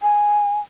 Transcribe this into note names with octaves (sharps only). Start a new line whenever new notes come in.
G#5